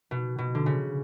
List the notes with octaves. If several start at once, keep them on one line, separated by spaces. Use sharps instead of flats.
B2
B2
D3
C#3